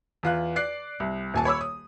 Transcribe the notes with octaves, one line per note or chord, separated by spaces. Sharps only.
E2 F4 F#6
D5 F#6 C7
C2
D#1 G#5 A5
C#5 B5 D6 E6
D#6